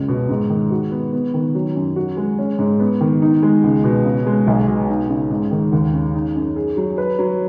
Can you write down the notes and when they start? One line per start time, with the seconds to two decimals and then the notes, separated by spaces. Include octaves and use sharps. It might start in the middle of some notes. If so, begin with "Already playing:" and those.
Already playing: C#2 F#2
0.09 B2
0.29 G#2
0.50 D#3
0.71 F#4
0.92 B3
1.13 B3
1.34 D#3
1.55 F#3
1.76 F#2
1.96 F#4
2.17 G#3
2.39 C#4
2.59 G#2
2.80 B3
3.01 D#3
3.22 D#4
3.43 G#3
3.64 C#2
3.84 B2
4.05 C#3
4.27 G#3
4.47 B1
4.68 B2
4.89 D#4
5.09 C#3
5.31 G#2
5.51 D#3
5.72 D#2
5.93 C#3
6.14 D#4
6.36 F#2
6.56 G#4
6.77 F#3
6.98 B4
7.19 F#3